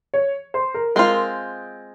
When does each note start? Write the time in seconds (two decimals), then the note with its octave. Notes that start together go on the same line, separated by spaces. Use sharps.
0.14 C#5
0.54 C5
0.74 A#4
0.95 G#3 C4 F4 A#4